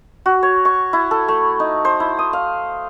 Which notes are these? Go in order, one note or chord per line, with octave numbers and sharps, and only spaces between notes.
F#4
C#5
C#6
E4
A4
A3
D#4
C5
E4
D#6
F5